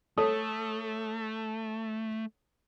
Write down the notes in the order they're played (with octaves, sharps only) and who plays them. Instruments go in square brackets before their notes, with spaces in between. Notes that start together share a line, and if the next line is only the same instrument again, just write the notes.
[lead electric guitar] A3 [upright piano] A4 C#5 D#6